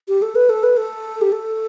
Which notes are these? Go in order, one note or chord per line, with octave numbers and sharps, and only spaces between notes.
G4
A4
B4
A4
B4
A4
G4
A4